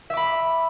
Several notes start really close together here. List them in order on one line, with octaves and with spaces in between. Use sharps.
E5 D6 B5